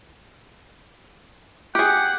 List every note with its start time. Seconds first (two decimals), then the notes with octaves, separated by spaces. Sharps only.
1.75 G4 G#4 F#5